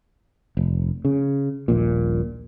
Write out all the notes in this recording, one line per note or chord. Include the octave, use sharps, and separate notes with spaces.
F1
C#3
D#1 A#1 A#2